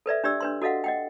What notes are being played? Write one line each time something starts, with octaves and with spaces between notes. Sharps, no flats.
A4 B4 D5 E5
D4 G4 D5 E6
D4 B4 C6
F#4 A4 D#5 F5 F#5
D#5 F#5 G5